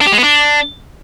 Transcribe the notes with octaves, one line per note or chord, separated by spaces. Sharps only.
D4
G4
G#3
B3
D4